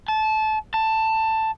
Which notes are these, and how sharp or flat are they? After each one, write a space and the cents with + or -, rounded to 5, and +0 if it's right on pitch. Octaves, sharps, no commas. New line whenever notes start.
A5 -20
A5 +10